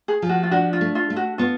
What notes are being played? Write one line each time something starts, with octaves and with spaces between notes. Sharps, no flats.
G#4
F3
F#4
F4
D4 F#4
F4
A3
F4
A3
F#4
B3 F4